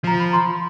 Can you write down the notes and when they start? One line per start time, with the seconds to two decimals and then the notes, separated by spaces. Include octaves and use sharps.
0.04 F3 A#5
0.20 B5
0.33 C6